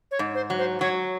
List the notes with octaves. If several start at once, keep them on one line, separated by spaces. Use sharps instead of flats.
C#5
G#2
C5
F#3
C5
F#3 C#5